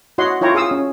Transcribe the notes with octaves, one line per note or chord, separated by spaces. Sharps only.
E4 F#4 C#5 D#5 F#5 C6
E4 F4 C#5 G5 A#5
G#4 F5 D#6 E6
C#4